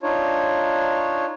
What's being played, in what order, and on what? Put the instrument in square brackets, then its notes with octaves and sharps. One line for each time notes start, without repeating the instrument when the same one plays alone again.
[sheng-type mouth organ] D4 D#4 F4 C#5